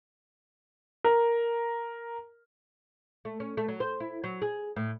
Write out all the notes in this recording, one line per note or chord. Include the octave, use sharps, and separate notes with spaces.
A#4
A3
C#4
A3
F#3
C5
E4
F#3
G#4
A2